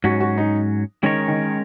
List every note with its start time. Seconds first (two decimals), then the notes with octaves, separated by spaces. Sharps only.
0.04 G#2 F#3 C#4 F#4
0.20 F#4
0.38 D#4
1.03 D#3 G#3 C#4 A#4 C#5
1.28 D#3